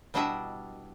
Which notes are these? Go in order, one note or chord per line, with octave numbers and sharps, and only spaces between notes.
B2 G3 D4 E4 D#5 E5